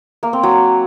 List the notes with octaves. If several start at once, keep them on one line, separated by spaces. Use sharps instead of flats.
A#3
C4
F#3